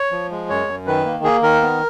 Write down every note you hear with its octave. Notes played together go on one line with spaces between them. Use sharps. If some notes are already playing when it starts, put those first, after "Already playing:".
Already playing: C#5
F3
G#3
F#2 C#5
F#2
D#3 B4
A#3
A#3 G#4
D#3 A#4
B3